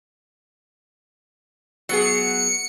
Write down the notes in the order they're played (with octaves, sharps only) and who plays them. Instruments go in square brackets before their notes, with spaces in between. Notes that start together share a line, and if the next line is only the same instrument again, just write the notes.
[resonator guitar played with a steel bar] F#3 B3 G#4 [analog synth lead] C#7